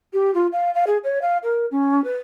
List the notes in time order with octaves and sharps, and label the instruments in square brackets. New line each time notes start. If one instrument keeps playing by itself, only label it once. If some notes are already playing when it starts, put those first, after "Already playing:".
[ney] G4
F4
F5
F5
G#4
C#5
F5
A#4
C#4
B4